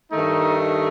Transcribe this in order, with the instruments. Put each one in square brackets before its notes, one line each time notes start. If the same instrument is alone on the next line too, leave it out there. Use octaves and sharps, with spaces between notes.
[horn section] G2 D#3 A3 D#4